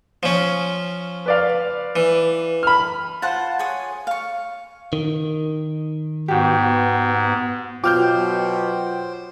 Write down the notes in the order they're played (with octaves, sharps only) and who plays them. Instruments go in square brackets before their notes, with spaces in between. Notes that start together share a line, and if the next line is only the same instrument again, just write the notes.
[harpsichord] F3 C#4
[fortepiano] B4 D5 F5
[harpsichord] E3
[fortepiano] B5 F6
[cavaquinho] F4 C5 F#5 A5
G#4 C#5 D#6
F5 C#6
[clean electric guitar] D#3
[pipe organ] G#2 [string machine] B3 [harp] F#4 G4
[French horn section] B2 F#3 [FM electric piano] F4 G5 [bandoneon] C5 [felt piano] D6 F6 G6